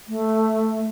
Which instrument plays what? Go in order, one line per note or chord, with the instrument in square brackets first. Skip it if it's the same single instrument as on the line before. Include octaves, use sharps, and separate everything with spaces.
[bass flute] A3